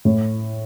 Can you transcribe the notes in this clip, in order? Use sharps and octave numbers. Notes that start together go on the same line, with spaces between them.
A2